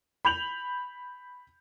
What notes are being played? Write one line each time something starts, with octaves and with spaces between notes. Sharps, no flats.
B5 G6 F7 F#7